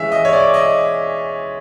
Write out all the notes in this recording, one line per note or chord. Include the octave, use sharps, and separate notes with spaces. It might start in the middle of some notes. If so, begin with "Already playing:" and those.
Already playing: E3 G#3 C#4 E5 F5
D#5
C#5
D5
D#5